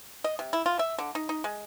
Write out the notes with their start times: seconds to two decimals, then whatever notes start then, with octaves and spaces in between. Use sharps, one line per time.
0.24 D#5
0.39 C3
0.53 E4
0.66 F4
0.79 E5
0.98 D3
1.15 D#4
1.29 D#4
1.44 G#3